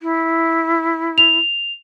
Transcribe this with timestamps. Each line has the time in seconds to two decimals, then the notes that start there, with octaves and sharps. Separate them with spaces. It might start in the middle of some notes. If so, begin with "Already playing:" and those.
0.01 E4
1.18 F7